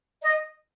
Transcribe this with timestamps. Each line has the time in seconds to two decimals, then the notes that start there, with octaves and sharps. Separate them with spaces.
0.22 D#5